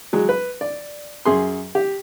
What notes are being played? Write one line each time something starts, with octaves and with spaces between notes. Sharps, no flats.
F#3 G#3
B4
D5
F#2 G#4 C6
G4